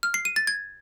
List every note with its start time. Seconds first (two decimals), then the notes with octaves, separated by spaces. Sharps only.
0.03 F6
0.14 C7
0.25 D#7
0.36 A6
0.47 G#6